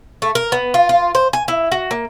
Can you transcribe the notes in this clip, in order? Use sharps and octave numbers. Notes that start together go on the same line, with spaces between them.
A3
A#4
B3
F4
F4
C5
G#5
E4
F#4
A#3